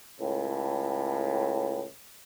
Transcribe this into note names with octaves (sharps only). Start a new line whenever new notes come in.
C#2 A2